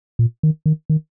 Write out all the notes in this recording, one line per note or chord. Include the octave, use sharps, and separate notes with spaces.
A#2
D#3
D#3
D#3